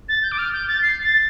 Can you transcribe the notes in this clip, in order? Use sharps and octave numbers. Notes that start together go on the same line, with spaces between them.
A6
G6
D6
F6
G6
A6
C7
A6